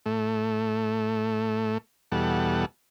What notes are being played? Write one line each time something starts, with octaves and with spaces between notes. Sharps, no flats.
A2 A3
E2 B2 G3 A4 F#5